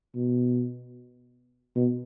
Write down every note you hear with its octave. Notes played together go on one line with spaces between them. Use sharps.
B2
B2